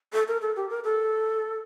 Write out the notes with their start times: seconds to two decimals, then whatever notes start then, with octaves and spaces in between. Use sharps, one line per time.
0.13 A4
0.28 A#4
0.42 A4
0.56 G4
0.70 A#4
0.84 A4